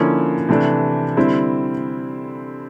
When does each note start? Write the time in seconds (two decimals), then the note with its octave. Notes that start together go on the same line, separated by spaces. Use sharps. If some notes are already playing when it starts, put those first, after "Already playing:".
Already playing: D3 F3 A#3 C#4 E4
0.49 C3 E3 A3 D4
1.17 D3 G3 C4 E4